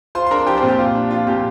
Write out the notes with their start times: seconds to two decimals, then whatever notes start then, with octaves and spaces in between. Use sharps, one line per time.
0.15 F4 C5 C6
0.27 C6
0.31 D4 A#4 A#5
0.47 F3 G4 G5
0.57 C4 C5
0.63 A#2
0.68 G4
0.79 F4
0.95 D4
1.11 F3 F4
1.27 A#2 G4